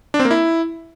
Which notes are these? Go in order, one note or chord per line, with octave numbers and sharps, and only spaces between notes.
D4
C4
A#3
E4